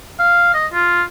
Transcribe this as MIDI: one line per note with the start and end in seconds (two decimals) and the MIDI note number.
0.19 0.50 77
0.54 0.67 75
0.73 1.02 65